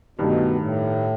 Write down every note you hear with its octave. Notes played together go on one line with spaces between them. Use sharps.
G2 B2 D#3 A3
A2